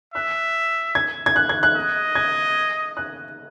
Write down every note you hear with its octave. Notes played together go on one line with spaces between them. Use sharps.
E5 F#6
G#6
G#6
F#6
G#6
F#6
D#5
G#6
F#6